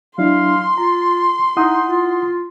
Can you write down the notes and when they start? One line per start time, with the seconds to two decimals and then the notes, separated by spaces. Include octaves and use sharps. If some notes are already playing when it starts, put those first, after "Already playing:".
0.18 F#3 D4 E4 F5 C6
0.78 F4 A#5
1.57 D#4 E4 F#5 D#6
1.88 F4